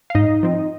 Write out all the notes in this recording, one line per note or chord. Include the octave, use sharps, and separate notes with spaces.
F5
G#2 D#4 D#5
F3 C4